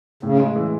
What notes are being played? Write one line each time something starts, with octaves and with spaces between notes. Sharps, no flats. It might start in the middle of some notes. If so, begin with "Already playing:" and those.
A2 C#3
G#3
E3